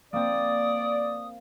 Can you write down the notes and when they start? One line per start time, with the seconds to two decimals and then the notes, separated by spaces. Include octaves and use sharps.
0.13 A#3 C4 D5 D#6